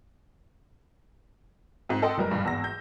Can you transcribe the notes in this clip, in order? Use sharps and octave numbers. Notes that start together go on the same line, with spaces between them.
G#2 C4
A4 D#5 F#5 G5 C6
F#1 G3 A#4
A#1 G2
G#1 E2 E6 A#6
G6